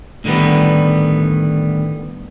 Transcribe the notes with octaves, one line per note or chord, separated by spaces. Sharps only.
A2 D3 D#3 G3 B3